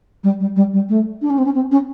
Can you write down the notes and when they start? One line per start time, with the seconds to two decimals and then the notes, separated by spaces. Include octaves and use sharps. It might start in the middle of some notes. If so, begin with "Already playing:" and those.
0.23 G3
0.39 G3
0.56 G3
0.73 G3
0.89 A3
1.21 D4
1.30 C#4
1.38 C4
1.45 C#4
1.54 C4
1.71 C#4